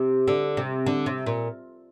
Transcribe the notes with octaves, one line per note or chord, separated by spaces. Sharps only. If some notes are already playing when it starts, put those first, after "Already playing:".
Already playing: C3
D3
C3
D3
C3
A#2